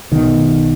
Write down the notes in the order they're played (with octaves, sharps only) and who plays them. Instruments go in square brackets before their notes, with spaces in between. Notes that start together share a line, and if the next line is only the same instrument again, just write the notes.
[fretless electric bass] B1 B2 D#3